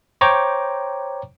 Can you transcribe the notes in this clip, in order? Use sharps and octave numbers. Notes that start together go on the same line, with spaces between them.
C5 C#5 G5 A#5 C#6 D6